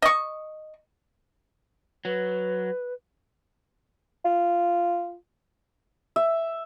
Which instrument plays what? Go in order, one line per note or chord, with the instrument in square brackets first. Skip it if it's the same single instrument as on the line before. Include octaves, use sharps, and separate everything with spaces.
[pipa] D#5 C#6
[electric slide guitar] F#3 [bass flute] B4
[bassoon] F4
[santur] E5